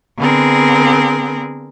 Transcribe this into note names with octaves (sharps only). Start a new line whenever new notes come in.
D3 B3 C4 G#4 A#4